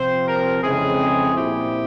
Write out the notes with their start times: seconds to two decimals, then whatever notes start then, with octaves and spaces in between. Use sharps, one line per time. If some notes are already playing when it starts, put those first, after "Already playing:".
Already playing: C3 F3 C4 C5
0.27 A#4
0.62 F2 C#3 E3 G#3 C4 G#4
1.33 A#2 F3 C4 E4 G4